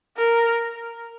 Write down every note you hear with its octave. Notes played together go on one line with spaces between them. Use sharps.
A#4